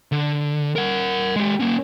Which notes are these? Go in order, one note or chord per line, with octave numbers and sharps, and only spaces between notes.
D3
A#4 F#5
G#3 G4
A#3 C#4